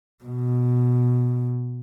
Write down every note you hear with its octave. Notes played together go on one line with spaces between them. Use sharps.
B2